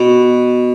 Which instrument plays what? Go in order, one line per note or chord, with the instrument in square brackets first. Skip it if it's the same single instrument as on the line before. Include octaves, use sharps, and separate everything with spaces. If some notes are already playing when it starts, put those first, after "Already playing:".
Already playing: [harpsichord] B2